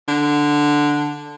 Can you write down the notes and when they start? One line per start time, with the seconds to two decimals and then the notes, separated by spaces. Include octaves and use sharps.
0.08 D3